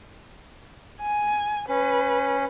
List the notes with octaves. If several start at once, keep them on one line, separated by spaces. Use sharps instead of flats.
G#5
C#4 B4